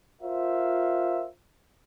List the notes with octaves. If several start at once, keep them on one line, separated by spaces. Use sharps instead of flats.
F4 A#4 C5 E5 F5